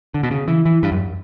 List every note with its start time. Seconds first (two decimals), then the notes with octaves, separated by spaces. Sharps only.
0.14 D3
0.23 B2
0.31 C#3
0.48 E3
0.66 E3
0.83 G2
0.92 F#2